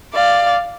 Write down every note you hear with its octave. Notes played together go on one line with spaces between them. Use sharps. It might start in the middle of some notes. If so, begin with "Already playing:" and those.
D5 F5